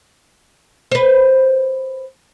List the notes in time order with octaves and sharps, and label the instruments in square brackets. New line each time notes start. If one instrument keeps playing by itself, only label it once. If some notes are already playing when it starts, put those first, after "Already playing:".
[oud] B4 C5